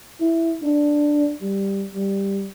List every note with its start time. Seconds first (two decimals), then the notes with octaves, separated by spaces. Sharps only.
0.20 E4
0.63 D4
1.42 G3
1.95 G3